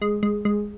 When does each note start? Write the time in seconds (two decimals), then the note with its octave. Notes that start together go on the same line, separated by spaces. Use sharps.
0.02 G#3
0.23 G#3
0.45 G#3